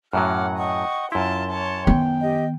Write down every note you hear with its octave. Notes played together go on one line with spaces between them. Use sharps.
F#2 A2 F#3 F#5 D6 F6
D#5 F#5 G5 C#6
F#2 E4 F4 A5 C6
C#5 A5
D#3 B3 G5
G4 D#5